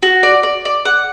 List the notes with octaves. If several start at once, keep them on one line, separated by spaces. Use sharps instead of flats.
F#4
D5
D5
D5
F#5